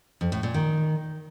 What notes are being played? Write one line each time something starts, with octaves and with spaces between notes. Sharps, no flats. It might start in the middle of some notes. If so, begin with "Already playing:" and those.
F2
A2
A#2
D#3